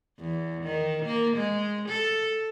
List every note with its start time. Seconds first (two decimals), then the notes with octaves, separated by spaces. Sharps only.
0.19 E2
0.63 D#3
1.06 A#3
1.37 G#3
1.89 A4